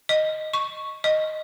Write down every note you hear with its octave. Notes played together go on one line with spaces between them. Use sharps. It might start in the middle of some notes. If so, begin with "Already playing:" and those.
D#5
C#6
D#5